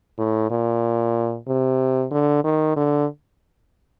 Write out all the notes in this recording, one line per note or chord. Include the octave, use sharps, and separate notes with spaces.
A2
A#2
C3
D3
D#3
D3